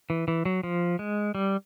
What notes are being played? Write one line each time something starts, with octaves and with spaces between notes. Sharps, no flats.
E3
E3
F#3
F3
G#3
G3